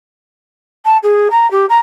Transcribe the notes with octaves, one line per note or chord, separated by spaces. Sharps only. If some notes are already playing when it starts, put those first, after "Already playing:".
A5
G#4
A#5
G4
A#5